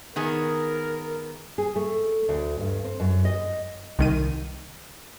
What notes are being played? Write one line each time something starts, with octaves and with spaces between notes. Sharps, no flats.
D#3 B3 G#4 A#4
G#4
A3
D2
G2
C4
F#2
D#5
C2 D#3 D#7